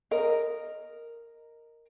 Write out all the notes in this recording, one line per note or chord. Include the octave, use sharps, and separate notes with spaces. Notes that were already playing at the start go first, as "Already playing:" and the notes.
A#4 D#5